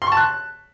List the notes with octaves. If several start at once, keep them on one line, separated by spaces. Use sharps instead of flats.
C6
C#6
A5
F#6